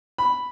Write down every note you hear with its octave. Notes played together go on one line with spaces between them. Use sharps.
B5